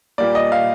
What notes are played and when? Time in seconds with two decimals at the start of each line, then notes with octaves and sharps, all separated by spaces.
0.18 A#2 G3 A#3 D5
0.35 D#5
0.52 F5